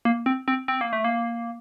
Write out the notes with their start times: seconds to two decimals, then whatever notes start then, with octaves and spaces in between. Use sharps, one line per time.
0.05 A#3
0.26 C4
0.48 C4
0.68 C4
0.81 A#3
0.93 A3
1.04 A#3